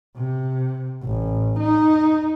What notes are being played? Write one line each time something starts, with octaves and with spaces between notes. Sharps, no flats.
C3
A1
D#4